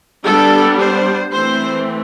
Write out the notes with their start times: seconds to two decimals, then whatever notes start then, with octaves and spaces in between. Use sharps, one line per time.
0.25 G3 B3 D4 A4
0.79 C5
1.33 E3 A3 C4 C5